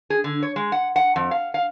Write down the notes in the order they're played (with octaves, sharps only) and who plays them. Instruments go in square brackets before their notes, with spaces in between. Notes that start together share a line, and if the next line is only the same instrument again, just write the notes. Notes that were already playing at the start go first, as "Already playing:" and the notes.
[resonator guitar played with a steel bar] G#4
D3
C#5
G#3
F#5
F#5
F2
F5
F5